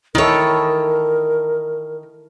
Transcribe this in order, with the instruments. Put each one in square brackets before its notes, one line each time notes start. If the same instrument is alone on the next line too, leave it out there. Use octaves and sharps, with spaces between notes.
[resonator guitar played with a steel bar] D#3 C#5 [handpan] E4 A4 [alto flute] A#4